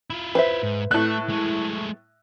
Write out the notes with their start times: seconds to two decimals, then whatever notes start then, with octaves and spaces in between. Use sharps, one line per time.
0.10 E4 F4
0.35 B4 C5 E5
0.63 G#2
0.91 A2 A3 F#6
1.30 G#3 A3